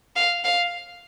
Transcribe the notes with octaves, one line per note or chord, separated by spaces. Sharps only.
F5
F5